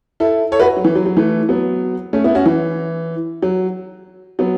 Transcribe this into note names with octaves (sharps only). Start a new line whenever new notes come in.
E4 A4
A4 C#5
F#4 B4
F#3
E3
F#3
F#3
E3 A3
F#3 B3
A3 C#4
B3 E4
C#4 F#4
E3
F#3
F#3 B3